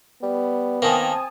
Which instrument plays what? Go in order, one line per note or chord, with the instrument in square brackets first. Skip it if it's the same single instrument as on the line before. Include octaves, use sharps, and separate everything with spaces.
[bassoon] G3 [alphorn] B3
[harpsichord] D#3 A#3 [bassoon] C4 [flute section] G#5 A5 D#6